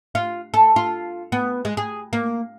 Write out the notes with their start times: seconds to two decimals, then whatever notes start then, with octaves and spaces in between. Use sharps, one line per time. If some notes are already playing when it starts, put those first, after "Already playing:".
0.15 F4
0.54 A4
0.76 F4
1.32 B3
1.65 G#3
1.77 G#4
2.13 A#3